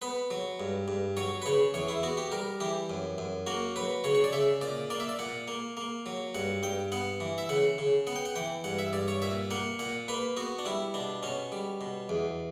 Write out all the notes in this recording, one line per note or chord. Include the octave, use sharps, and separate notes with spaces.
B3 B4
F#3
G2
G2
F#3 C#5
B4
C#3 C#5
E2 C#5
E4
B3 F#4
G4
G3 A#4
E3 G4
F#2
F#2
A#3 F#4
F#3 B4
C#3 C#5
C#5
D5
C#3 E5
A#2 D5
A#3 D5
E5
D5
A#2 F#5
A#3
A#3
F#3
G2 F#5
G2 G5
B3 F#5
E3
E5
C#3 F#5
C#3
B3 F#5
G5
F#5
E3 G5
G2 F#5
E5
G2 D5
C#5
A#2 E5
A#3 F#5
A#2 F#5
A#3 B4
B3 F#4
D4
G3 E4
B2 D4
B2 C#4
G3
B2
E2